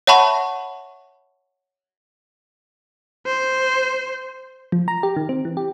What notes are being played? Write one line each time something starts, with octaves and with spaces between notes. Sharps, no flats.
C#5 E5 F#5 A5 B5 C#6
C5
F3
A#5
G4
D#3
C4
E3
G4